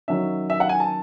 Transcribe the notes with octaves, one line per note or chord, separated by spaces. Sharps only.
D#3 F#3 C#4 E5
E5
F#5
G#5
A5